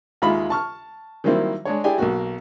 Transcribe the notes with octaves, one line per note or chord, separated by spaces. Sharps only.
D#2 G#3 D#4 F4 E5 B5
A5 C#6 F6
D#3 F#3 G3 A#3 C4 E4
G#3 D4 C#5
E4 G4 G#4 D5 G5 G#5
B1 A#3 F#4